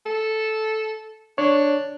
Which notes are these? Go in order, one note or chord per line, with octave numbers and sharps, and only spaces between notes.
A4
D4 C#5